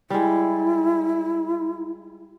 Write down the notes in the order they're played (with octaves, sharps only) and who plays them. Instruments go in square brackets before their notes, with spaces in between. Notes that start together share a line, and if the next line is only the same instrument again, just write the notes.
[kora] G3 G#3 [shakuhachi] E4